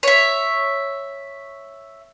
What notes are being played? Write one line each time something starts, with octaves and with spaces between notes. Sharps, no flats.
C#5 E5